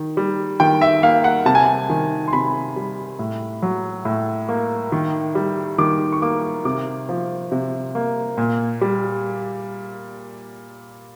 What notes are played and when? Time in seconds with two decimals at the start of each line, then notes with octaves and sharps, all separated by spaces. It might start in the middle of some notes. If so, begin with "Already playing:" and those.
Already playing: D#3
0.17 G3
0.60 D#3 G5
0.81 E5
1.03 A#3 F5
1.24 F#5
1.46 C3 A5
1.55 G#5
1.64 A5
1.90 D#3
2.28 C6
2.33 C3 B5
2.76 G3
3.19 A2
3.62 F#3
4.05 A2
4.49 A#3
4.92 D#3
5.35 G3
5.78 D#3 D6
6.12 C#6
6.22 A#3 D6
6.65 C3 D6
7.09 F3
7.52 C3
7.95 A#3
8.38 A#2
8.81 G3